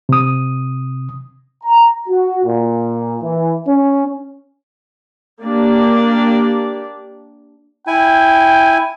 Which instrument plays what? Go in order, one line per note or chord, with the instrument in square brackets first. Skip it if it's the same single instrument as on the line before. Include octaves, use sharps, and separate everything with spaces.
[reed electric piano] C3 D#6
[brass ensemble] A#5
F#4
A#2
E3
C#4
[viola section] A#3 D4 G4 D5
[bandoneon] E4 G#5 [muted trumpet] G5